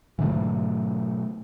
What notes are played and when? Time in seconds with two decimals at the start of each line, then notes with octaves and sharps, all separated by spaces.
0.19 G#2 B2 D3 E3 F#3 A3